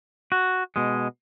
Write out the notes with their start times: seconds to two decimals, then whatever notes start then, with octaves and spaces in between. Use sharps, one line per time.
0.32 F#4
0.76 B2 G#3